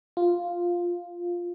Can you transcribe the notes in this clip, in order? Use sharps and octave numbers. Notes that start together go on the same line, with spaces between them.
F4